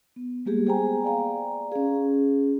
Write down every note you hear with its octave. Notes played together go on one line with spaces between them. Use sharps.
B3
G3 G#3 A#3 G4 G#4
B3 G#4 C5 G5 G#5 A#5
D5 F5 A#5
C#4 G#4